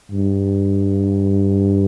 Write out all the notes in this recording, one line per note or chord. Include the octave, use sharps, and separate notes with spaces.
G2